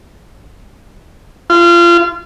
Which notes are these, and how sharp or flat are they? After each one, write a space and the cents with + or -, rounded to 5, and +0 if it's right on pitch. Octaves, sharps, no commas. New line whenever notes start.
F4 -25